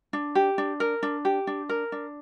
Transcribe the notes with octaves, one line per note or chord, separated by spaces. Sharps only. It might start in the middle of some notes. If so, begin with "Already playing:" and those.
D4
G4
D4
A#4
D4
G4
D4
A#4
D4